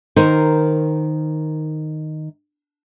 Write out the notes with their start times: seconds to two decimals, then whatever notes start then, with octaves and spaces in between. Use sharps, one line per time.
0.16 D#3 D#4 A#4 C5